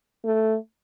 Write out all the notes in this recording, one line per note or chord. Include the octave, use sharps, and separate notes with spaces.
A3